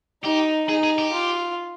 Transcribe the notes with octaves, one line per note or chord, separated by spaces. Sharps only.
D#4 G4
D#4 G#4
G#4
G4
F4